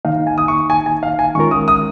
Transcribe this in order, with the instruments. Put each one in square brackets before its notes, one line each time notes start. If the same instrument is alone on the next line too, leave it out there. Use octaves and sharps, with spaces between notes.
[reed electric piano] D#3 A#3 D#4 [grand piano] F5
[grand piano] G#5
D#6
C#6
G#5
G#5
F5
G#5
[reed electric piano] D#3 G#3 C#4 F4 A#4 [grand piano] C#6
[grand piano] D#6
D#6